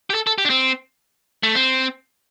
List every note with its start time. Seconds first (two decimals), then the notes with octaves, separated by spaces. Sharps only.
0.10 G4
0.14 A4
0.27 A4
0.38 G4
0.45 D4
0.50 C4
1.43 A3
1.55 C4